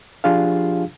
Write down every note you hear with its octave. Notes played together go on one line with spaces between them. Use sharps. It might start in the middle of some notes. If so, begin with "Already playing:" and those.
F3 D4 F4 G4 G#4 F5